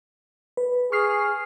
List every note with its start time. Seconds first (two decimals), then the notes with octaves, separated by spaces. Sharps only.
0.57 B4
0.92 G#4 C#6 F6 C7